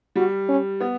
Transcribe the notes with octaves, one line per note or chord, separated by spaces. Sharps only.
G3 F#4
C#4
B3